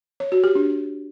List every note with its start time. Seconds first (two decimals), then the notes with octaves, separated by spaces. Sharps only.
0.20 C#5
0.32 F#4
0.44 G4
0.55 D4